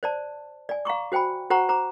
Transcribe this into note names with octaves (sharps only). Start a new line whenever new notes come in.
C5 D5 A5
D5 G#5
F5 A#5 C#6 D6
F#4 C5 G5 G#5 B5
F#4 C5 F#5 A#5 C#6
C5 A#5 D6